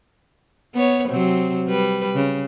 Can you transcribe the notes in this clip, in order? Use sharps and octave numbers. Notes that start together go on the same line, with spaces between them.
B3 B4 C#5
C3 F#3 C4
G3 B4
C#3